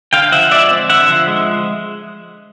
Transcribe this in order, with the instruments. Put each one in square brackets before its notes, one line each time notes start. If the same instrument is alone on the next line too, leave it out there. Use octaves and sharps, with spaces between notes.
[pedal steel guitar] D3 F5 G5
F3 E5 F#5
G#3 D5 E5
C4
D3 E5 F#5
F3
G#3